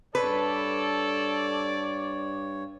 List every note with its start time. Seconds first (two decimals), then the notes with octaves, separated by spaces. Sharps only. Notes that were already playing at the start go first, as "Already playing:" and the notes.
0.15 G2 A4 B4 C#5 D5